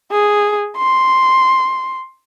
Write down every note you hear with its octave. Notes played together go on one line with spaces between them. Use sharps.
G#4
C6